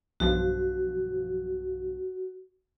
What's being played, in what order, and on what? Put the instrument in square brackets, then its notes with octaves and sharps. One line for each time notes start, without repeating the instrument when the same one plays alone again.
[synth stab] B1 G2 F3 [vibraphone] F#4